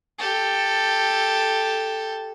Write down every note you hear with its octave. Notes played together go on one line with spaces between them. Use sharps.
G4 A4